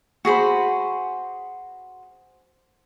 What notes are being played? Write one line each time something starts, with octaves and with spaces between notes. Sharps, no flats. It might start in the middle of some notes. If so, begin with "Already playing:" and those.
F#4 G#4 C5 B5